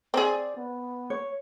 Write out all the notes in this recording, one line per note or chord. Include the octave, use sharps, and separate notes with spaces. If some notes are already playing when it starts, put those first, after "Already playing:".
C4 G#4 D5
B3
C#5